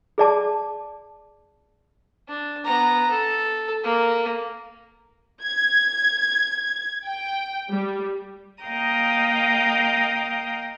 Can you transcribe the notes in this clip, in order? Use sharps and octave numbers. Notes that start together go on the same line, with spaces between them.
G#4 D5 A5 D6
D4
B3 A#5
A4
A#3
G#6
G5
G3
A#3 D#5 F5 G5 A#5 D#6